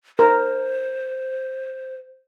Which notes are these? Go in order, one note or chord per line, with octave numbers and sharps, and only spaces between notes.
A#4 C5